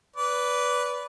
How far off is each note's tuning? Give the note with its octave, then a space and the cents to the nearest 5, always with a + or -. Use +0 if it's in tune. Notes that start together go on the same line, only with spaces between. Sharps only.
B4 +0 D5 -20